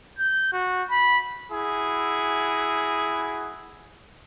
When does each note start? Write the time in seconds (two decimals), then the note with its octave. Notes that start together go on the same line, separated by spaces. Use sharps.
0.19 G6
0.53 F#4
0.90 B5
1.52 E4 F#4 G#4